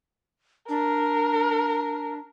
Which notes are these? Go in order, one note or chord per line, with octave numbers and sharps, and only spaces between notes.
D4 A#4